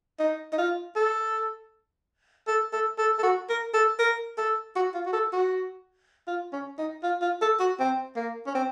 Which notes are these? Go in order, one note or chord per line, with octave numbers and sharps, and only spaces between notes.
D#4
D#4
F4
A4
A4
A4
A4
A4
F#4
A#4
A4
A#4
A4
F#4
F4
F#4
A4
F#4
F4
C#4
D#4
F4
F4
A4
F#4
C4
A#3
C#4
C4